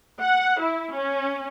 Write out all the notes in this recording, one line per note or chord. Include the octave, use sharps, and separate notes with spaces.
F#5
E4
C#4